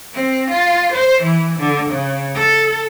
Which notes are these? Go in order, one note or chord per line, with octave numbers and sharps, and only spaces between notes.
C4
F4
C5
E3
D3
C#3
A4